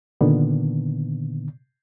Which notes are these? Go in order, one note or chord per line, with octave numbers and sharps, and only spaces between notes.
A#2 D3 D#3 B3